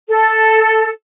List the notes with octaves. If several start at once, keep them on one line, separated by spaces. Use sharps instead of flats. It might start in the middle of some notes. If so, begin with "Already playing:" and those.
A4